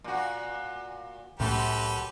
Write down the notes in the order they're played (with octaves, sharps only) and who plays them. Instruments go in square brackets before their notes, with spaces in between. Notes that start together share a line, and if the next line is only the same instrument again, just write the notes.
[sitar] A#2 F#4
[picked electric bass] C2 A2 A3 [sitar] F#2 [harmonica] G4 A4 B4